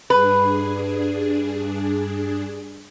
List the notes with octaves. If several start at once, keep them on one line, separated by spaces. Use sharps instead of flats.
G2 D4 G#4 B4